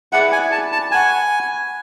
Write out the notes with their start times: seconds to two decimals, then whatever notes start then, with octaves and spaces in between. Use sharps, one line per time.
0.12 E4 G#4 B4 D5 F#5
0.32 G#5
0.52 A5
0.72 A5
0.91 B4 F#5 G#5 C#6